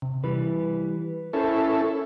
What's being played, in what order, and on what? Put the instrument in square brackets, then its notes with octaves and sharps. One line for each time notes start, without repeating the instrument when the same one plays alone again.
[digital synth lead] C3
[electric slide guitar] E3 G3 [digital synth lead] B4
[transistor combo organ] C#4 E4 A4 [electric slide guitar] A#4 C5